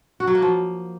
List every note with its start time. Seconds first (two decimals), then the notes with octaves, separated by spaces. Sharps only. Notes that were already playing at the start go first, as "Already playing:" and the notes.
0.20 F#4
0.27 F#3
0.35 A#3
0.42 F3